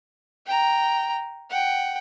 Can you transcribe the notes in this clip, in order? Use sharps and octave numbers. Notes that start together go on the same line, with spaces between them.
G5 A#5
F#5 G5